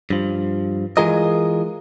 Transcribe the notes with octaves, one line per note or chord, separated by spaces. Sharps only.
G2 F3
E3 G#3 F4 G#4 A#4 D#5